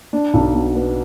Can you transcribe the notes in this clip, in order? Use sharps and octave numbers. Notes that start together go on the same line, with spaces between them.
D4
B1
B2
B3